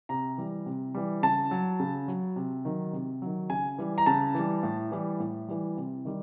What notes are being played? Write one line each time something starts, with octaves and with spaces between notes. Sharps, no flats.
C3 A#5
E3 G3
C3
E3 G3
C#3 A5
F#3
C#3
F#3
C3
D#3 F#3
C3
D#3 F#3
C#3 G#5
E3 G3
A#5
C#3 A5
E3 G3
A2
E3 G3
A2
E3 G3
C3
D#3 G3